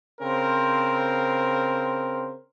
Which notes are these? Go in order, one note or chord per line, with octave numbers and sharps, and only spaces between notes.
C#3 C4 A#4 C5